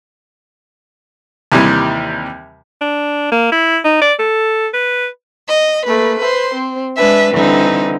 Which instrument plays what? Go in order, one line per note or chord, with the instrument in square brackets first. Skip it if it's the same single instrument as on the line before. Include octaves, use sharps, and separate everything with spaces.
[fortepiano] D#2 C3 E3 G3
[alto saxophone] D4
A#3
E4
D#4
D5
A4
B4
[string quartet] D#5
A3 A#3 B4
B4 C5 C6
C4
G#3 D4 B4 E5
D3 E3 G3 C4 D#4